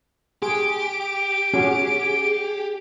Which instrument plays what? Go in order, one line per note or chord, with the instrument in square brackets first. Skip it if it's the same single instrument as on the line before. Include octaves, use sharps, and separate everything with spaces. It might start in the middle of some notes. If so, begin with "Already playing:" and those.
[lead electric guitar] G4 [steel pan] G#4 [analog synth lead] D7
[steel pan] C#4 F#4 [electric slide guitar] G#4